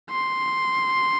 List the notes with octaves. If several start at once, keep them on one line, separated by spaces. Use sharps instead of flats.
C6